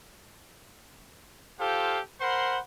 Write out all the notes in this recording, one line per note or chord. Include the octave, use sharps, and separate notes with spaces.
F4 G4 A4 C5 F5
A#4 C5 F#5 B5 C6